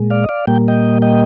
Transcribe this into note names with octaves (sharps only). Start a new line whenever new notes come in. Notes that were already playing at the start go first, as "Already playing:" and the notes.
Already playing: A#2 G#3
D5 F5
D#5
D5 F5
A#2 G3 A#3 G5
D#5 G5
D#5 G5